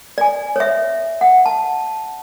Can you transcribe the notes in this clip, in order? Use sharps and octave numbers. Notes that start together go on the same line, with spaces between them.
D5 G#5
C#5 E5
F#5
A5